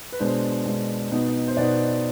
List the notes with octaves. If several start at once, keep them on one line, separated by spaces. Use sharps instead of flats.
B4
B2 G#3 D4 C5
B2 G#3 D4
B2 B3 D#4
C5
B2 B3 D#4 D5